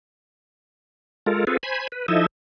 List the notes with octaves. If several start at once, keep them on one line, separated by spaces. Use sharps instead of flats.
G#3 F4 A4 A#4
C4 F4 G#4 A4 B4
C5 G#5 B5
B4
F3 D#4 E4 A4 D#5 E5